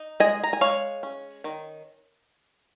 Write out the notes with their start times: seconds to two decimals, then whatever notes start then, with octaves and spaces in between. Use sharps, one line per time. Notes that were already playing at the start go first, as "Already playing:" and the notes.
Already playing: D#4
0.20 G#3 D#5 G#5
0.43 A#5
0.53 G#5
0.61 G#3 C#5 F5
1.03 C#4
1.44 D#3